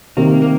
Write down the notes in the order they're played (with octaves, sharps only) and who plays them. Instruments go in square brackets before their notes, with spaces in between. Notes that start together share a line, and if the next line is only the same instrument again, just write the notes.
[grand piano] C3 D#3 [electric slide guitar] A#3
[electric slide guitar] A#3